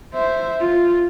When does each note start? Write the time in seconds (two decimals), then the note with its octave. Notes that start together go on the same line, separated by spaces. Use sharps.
0.14 C5 E5
0.61 F4